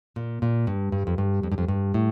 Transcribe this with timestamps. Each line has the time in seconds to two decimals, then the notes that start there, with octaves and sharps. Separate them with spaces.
0.16 A#2
0.42 A#2
0.67 G2
0.92 G2
1.07 F2
1.18 G2
1.43 F2
1.52 G2
1.58 F2
1.68 G2
1.94 A2